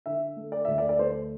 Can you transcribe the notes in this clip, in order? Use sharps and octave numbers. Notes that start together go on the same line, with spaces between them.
D3 E5
A3
D5
D2 E5
D5
D5
A3 C5